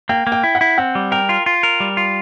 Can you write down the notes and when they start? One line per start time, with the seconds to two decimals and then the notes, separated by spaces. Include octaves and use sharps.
0.09 A#3 G5
0.27 A#3
0.32 G5
0.44 E4
0.55 F#5
0.61 E4
0.78 C4 F#5
0.95 G3
1.12 A#4 G5
1.29 F4
1.46 F4
1.63 A#4
1.80 G3
1.97 F4